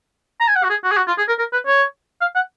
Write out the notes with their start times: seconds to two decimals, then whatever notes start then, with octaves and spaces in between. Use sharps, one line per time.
0.40 A#5
0.48 G#5
0.56 F#5
0.64 F#4
0.70 G#4
0.84 F#4
0.91 G#4
0.97 F#4
1.08 F4
1.18 G#4
1.28 A#4
1.39 A#4
1.53 B4
1.66 C#5
2.21 F5
2.35 F#5